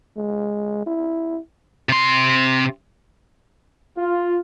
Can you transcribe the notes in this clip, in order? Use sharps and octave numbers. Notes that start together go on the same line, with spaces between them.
G#3
E4
C3 C6
F4